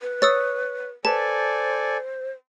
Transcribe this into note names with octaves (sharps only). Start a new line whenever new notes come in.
B4
C#5 D#6 E6 A6
A4 B4 C5 D5 G#5 A5